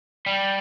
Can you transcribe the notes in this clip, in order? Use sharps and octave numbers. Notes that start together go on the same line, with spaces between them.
G3